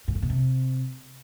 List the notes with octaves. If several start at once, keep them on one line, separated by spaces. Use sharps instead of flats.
A2
G#2
B2
C3